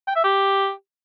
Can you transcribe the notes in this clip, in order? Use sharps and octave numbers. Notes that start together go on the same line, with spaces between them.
G5
E5
G4